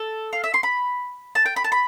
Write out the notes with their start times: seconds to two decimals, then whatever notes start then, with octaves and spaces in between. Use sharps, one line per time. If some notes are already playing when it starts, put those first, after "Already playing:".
Already playing: A4
0.33 F5
0.44 E5
0.54 C6
0.63 B5
1.35 A5
1.46 G5
1.56 B5
1.64 A5
1.72 B5